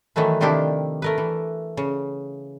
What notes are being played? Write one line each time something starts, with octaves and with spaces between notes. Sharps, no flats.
D#3 E3 F#3 A3 B4
C3 D#3 F3 D4 E4 G4
A3 A#4 B4
E3
C#3